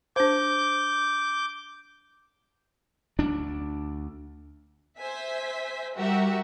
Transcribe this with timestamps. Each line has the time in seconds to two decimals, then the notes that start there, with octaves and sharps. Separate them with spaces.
0.16 D4 C5 D6 G6
3.19 D2 D4
4.99 C5 E5 G#5 B6
5.96 G3 F#4 G4 A#4 E5